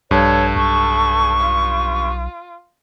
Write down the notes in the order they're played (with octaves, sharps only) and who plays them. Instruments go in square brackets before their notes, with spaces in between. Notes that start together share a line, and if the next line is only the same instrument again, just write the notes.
[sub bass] A#1 [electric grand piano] G2 [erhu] A4 [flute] C#5
[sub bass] B1 [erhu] A4 [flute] C#6
[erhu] F4